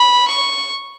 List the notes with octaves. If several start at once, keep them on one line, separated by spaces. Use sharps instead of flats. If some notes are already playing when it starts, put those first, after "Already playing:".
Already playing: B5
C#6